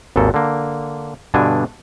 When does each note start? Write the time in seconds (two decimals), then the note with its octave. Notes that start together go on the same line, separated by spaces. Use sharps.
0.16 G#1 D#2 G#2 A4
0.34 D3 A#3
1.34 G2 B2 D3 D4 G#5